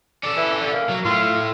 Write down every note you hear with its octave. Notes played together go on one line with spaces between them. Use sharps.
C#4 A4 D5
E3
D3
A#3
F#3
A2 A3 F4